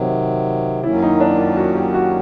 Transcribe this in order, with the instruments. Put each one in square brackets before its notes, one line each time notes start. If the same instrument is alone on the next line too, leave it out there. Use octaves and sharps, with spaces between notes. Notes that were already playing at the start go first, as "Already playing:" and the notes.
Already playing: [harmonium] C3 D#3 F#3
[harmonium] F#2 D#3 F#3 A#3 C#4 [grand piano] E4
[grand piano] D#4
D4
F4
F#4
G4
F#4